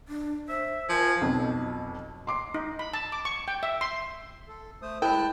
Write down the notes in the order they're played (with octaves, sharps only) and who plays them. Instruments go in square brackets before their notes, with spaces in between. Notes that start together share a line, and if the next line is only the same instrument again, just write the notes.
[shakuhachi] D4
[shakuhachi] C5 [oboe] E5
[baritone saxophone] F3 [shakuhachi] A#4 [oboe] G#5
[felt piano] B1 F2 B2
C6 D6 C7
[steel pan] D#4
B5
A5
D6
C#6
G5
E5
C6
[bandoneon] A4
A3 C5 D#6
[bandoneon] G#3 A5 F#6 [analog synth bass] E4 [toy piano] A#4 B5 [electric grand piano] G5